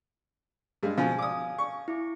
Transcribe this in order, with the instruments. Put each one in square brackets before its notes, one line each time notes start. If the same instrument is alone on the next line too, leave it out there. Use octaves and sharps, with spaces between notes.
[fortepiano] G2 G#3 F5
[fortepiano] B2 F3 [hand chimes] F5 G#5
[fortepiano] D6 D#6
C#6
[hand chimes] E4 D6